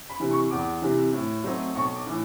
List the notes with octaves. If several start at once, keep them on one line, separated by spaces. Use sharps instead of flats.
B5
C3 E3
C#6
E2 D6
C3 E3
A2
F#3 A3 C4 D#4
B1 C#6
D6
A2 E3